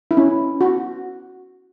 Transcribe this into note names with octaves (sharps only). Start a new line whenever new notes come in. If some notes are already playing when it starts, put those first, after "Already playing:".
E4
C#4
F#4